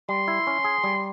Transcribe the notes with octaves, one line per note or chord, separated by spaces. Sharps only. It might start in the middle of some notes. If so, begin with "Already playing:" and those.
G3 C6
E4
C#4
G#4
G3